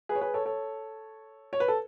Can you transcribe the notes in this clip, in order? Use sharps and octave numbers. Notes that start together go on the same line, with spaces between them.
G#4 B4
C#5
G#4 B4
A4 C#5
A4 C#5
C#5
B4
A4